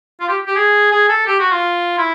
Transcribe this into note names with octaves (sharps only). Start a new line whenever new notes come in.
F4
G4
G4
G#4
G#4
A4
G4
F#4
F4
E4